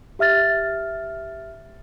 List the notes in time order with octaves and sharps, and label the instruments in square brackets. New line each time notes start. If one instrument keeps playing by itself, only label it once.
[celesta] G4 E5 F6 A6